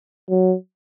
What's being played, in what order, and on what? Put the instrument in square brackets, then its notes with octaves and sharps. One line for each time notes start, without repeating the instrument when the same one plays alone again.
[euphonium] F#3